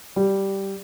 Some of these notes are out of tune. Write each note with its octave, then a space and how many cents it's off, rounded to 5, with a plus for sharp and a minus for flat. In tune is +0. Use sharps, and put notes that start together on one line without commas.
G3 -5